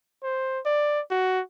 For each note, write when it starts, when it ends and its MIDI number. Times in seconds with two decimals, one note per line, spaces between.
0.23 0.59 72
0.65 1.01 74
1.10 1.41 66